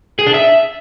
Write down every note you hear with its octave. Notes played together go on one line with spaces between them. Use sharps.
G#4
D4
E5